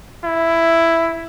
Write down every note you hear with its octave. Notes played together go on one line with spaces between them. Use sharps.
E4